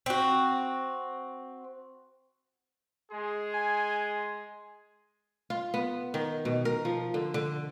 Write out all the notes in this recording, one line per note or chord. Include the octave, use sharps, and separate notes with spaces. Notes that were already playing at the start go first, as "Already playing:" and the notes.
C4 F#4
G#3 G#4 C6
G#5
F4
B3
D#3
B2
A#4
F3
D3
D3